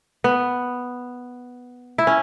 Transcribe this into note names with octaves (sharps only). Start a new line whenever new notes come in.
B3
E4
C#4